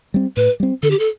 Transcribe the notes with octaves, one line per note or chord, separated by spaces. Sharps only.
G3 C4
A2 B4
G3 C4
D3 A4
G4
A4